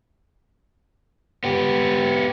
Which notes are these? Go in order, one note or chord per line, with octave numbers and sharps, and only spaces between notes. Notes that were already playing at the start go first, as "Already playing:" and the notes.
B3 G4